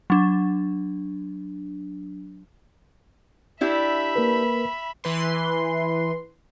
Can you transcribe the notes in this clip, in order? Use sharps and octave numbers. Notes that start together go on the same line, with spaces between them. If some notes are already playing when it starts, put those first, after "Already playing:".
F#3 D4
D4 E4 G4 E5 B5
A#3 A#4 B4
E3 B4 C6